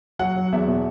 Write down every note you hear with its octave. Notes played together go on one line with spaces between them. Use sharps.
F#3 F#5
F#3
E2 E5
B2